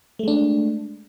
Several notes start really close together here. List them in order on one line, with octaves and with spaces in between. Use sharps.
A3 G#3 D4